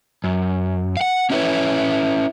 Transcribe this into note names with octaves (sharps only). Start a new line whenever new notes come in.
F#2
F5 F#5
C#4 D#4 E4 F#4 B4 C#5